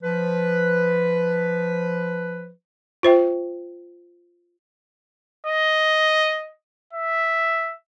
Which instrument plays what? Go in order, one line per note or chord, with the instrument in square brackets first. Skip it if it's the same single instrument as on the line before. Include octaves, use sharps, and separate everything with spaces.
[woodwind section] F3 B4
[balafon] F4 C5 E5 G5
[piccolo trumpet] D#5
E5